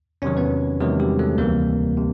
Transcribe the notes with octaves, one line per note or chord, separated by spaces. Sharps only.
E2 C3 D#3 F#3 C#4 C#5
B3 B4
E2 C3 D#3 F#3 G#3 G#4
G3 G4
A3 A4
D2 C3 E3 G3 A#3 A#4
C3